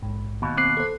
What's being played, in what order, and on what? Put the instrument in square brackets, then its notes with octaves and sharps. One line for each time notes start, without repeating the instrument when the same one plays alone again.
[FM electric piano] A#1 G#2
[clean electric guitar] D#2 B2
[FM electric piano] C4 [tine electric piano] D6 F#6 C7
[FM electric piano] A4 C5